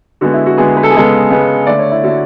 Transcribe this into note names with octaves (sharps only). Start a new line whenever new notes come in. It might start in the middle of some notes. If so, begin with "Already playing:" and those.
D3 G#3 B3 F#4
E4
F#4
D3 G#3 B3 G#4
B4
A4
G#4
C#3 G#3 B3 A4
C#3 G#3 B3
D3 A3 D5
C#5
E4
D3 A3 F#4